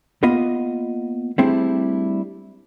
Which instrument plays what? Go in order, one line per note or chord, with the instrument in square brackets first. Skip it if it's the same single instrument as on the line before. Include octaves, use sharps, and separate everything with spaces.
[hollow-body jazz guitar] A#3 B3 F4 D#5 B5
G3 A3 C4 D4 E4 G#4